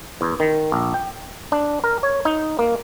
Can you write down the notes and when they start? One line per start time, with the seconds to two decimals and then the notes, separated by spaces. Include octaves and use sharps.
0.21 E2
0.40 D#3
0.72 A#1
0.94 G5
1.52 D4
1.84 A#4
2.03 C#5
2.25 D#4
2.59 A#3